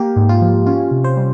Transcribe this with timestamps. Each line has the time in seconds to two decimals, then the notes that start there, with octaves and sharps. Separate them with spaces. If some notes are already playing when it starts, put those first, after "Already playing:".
Already playing: A#3 G4
0.16 G#2
0.29 F4
0.41 F3
0.66 C#4 F4
0.91 C3
1.04 C5
1.16 G3